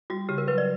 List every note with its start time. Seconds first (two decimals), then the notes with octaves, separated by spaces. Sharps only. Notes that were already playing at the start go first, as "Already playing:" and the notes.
0.10 G3 F#4
0.29 C#3 G4
0.38 A#4
0.48 F#3 B4
0.58 D5